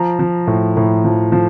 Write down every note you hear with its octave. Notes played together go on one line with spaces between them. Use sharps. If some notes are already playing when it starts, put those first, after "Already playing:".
Already playing: F3 A#5
F3
A2
A2
F3
F3